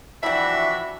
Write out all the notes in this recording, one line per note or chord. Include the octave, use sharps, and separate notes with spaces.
E3 F3 G3 D4 E4 F#4 E5